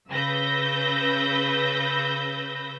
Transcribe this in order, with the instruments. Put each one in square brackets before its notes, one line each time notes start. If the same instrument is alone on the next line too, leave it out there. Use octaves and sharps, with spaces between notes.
[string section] C#3 B4 E6 G6 A#6